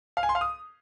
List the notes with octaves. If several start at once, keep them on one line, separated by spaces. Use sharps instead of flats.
F5
G#5
C6
F5
D#6